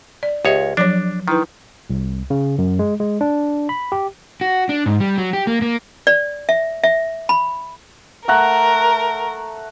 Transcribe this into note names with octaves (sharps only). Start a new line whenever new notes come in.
D5
C#2 G4 C#5 D#5 E5
F3 F#3 D4 C#5
D#3 D#4 E4 B4
C2
C#3
F#2
G#3
G#3
D4
B5
G4
F#4
D4
G#2
G3
F#3
G4
A#3
A#3
D5
E5
E5
B5
A3 A#4 F#5 A#5